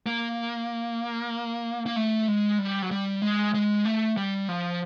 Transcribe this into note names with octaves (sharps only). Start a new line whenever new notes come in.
A#3
A#3
A3
G#3
G3
F#3
G3
G#3
G#3
A3
G3
F3